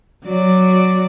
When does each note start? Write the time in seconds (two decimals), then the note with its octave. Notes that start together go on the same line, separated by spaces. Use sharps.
0.25 F#3 F#4 D5